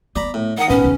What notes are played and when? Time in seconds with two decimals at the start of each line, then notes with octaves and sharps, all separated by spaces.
0.16 B3 D5 A#5 B5
0.34 A2
0.58 D#3 F#5 A#5 D#6
0.69 G#2 B3 C#4
0.84 E2 C#3